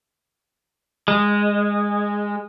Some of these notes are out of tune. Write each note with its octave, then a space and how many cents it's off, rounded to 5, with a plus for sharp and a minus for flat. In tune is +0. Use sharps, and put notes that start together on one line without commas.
G#3 -10